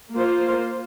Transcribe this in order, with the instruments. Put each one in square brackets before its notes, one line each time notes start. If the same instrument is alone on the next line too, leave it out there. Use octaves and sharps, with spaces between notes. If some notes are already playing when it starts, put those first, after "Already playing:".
[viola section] A#3 F4 C5